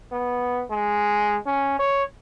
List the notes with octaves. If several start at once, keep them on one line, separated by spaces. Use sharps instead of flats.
B3
G#3
C#4
C#5